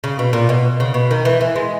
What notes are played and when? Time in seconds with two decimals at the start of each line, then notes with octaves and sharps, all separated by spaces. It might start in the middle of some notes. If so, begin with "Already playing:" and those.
0.04 C#3
0.19 B2
0.33 A#2
0.49 B2
0.80 C#3
0.94 B2
1.11 D#3
1.25 E3
1.41 E3
1.56 G#3